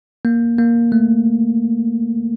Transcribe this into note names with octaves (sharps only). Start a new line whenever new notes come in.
A#3
A#3
A3